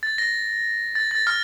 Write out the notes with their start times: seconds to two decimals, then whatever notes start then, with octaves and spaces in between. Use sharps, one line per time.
0.03 A6
0.18 A#6
0.95 A6
1.11 A6
1.27 F6